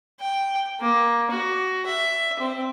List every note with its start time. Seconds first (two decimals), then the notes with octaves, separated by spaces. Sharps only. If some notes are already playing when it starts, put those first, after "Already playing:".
0.20 G5
0.80 A#3
1.31 F#4
1.86 E5
2.40 C4